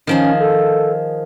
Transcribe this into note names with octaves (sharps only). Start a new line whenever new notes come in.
D#3 F3 C#4 G#4
A4